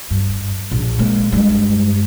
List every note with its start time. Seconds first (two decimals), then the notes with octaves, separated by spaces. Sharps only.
0.10 G2
0.71 A#1
0.99 G#3 A#3
1.32 G2 G#3